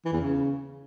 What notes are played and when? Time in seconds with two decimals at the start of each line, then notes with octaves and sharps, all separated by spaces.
0.05 E3
0.13 E2
0.21 C#3